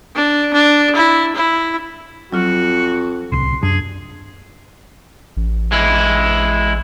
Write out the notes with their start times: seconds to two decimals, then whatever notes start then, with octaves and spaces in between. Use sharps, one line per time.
0.15 D4
0.53 D4
0.95 E4
1.36 E4
2.33 F2 F#3 F4 F#4
3.32 D1 C2 C6
3.63 F#2 D4 G#4
5.37 A1
5.72 G#3 E4